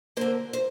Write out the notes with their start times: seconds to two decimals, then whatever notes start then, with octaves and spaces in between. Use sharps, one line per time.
0.17 D3 A#3 C5
0.53 C5